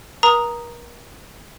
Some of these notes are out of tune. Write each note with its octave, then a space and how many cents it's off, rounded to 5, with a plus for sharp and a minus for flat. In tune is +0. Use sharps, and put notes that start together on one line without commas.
A#4 +40 A#5 +0 D#6 +0